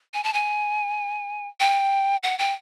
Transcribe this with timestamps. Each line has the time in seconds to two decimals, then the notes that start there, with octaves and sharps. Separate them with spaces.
0.14 G#5
0.24 A5
0.34 G#5
1.60 G5
2.23 F#5
2.39 G5